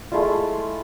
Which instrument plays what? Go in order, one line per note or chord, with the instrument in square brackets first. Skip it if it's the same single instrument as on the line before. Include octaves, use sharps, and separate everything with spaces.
[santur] G#3 A3 E4 F4